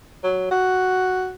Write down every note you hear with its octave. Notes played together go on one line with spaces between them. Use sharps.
F#3
F#4